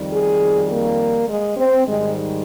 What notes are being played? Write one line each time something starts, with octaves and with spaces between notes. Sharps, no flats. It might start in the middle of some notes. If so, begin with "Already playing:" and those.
Already playing: F2 D#3 G3
G#4
A#3
G#3
C4
G#2 D#3 G3 G#3